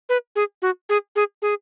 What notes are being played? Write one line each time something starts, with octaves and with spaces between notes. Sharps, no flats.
B4
G#4
F#4
G#4
G#4
G#4